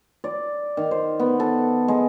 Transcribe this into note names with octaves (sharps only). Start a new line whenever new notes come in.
D5
D#3
C5
B3
A4
G#3